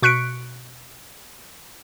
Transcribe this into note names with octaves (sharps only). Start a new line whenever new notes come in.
B2 C#6 F#6 B6 C#7 D7